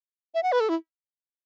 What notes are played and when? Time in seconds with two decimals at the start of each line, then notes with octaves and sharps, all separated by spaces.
0.34 E5
0.43 F#5
0.52 B4
0.60 A4
0.69 E4